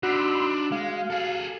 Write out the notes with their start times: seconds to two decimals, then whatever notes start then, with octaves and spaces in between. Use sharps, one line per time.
0.03 D4 D#4 F#4 B5 C6 E6
0.72 G#3 F5
1.10 G#4 A4